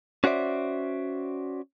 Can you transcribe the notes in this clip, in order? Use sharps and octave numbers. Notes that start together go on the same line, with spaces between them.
C#4 F#4 C5 D5 E5